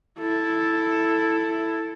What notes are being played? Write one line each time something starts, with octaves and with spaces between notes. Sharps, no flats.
E4 A4